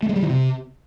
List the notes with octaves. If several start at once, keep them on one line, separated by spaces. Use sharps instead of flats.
A3
G#3
G3
E3
C3